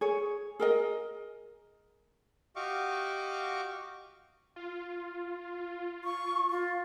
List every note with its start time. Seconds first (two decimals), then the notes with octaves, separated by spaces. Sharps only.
0.01 G#4 C#5
0.60 G#4 A#4 D#5
2.56 F#4 G4 D#5 F5 C#6 D6
4.56 F4
6.04 C#6
6.50 F4